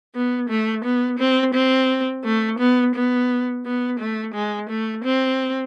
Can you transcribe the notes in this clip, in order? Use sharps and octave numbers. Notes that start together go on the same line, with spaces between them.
B3
A3
B3
C4
C4
A3
B3
B3
B3
A3
G#3
A3
C4